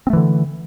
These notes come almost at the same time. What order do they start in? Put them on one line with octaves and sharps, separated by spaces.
C4 A3 E3 D3